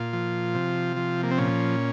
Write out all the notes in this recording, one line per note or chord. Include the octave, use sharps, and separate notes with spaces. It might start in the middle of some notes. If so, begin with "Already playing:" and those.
Already playing: A#2 F4
F3
C3
F3
A#3
C4
A#2 C#4